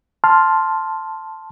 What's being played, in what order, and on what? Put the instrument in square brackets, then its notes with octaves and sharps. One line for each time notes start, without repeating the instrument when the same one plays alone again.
[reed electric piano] A5 C6 F6